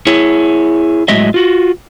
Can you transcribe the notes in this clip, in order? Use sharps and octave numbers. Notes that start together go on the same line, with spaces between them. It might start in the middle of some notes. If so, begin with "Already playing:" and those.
E4 G#4 C#5
A2 F#3 G#3 D#5 E5
F4 F#4